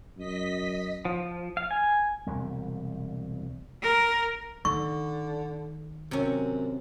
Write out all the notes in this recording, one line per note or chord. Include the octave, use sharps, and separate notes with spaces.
F#2 D#5 B6
F3
F5
G#5
E1 C2 G3
A#4
D3 D#3 C#6
F#2 C3 C#4